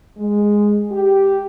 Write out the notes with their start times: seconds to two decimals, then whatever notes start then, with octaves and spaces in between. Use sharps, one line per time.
0.17 G#3
0.91 G4